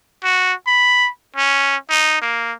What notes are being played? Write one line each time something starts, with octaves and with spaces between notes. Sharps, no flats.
F#4
B5
C#4
D#4
A#3